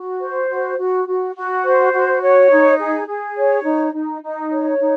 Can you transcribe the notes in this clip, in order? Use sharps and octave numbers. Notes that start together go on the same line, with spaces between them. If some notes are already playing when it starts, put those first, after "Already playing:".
Already playing: F#4
C5
F#4
F#4
F#4
F#4
C5
F#4
C#5
D#4
G#4
G#4
C#5
D#4
D#4
D#4
C#5
D#4